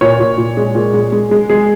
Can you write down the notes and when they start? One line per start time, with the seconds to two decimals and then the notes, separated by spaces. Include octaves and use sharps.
0.01 A#2 C#5
0.19 A#2
0.38 A#2
0.57 G#3
0.75 A#2
0.94 G#3
1.12 G#3
1.31 G#3
1.49 G#3 G#4